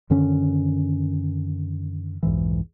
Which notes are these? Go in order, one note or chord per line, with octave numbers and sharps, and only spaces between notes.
F#2 D3 D#3 C#4
B1 F2 G#2 E3